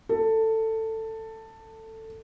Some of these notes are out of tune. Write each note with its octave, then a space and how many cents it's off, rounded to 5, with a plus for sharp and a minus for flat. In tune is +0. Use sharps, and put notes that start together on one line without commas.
A4 +15